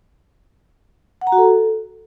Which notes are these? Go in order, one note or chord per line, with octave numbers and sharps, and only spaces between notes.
F#5
A#5
F#4
A4